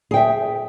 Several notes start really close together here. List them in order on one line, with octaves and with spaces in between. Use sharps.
G#4 G5 E5